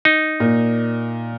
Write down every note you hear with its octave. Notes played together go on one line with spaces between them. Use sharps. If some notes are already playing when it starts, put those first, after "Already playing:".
D#4
A#2